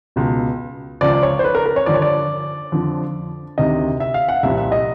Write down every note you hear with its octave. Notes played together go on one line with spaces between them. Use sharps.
C#2 B2
C#2 C#3 F3 D5
D5
C#5
C5
B4
A#4
A#4
C#5
G2 D3 F3 D5
C#5
D5
F2 D3 F3
D2 C3 D#3 D#5
E5
F5
F#5
F5
C2 A#2 F3 E5
E5
D#5